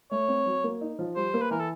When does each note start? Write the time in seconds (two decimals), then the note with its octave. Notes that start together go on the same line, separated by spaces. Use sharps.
0.11 A3 C#5
0.28 C4
0.46 F#3
0.64 A#3
0.81 D#4
0.99 F3
1.16 G3 C5
1.34 A#3
1.42 B4
1.51 E3 A#4
1.60 A4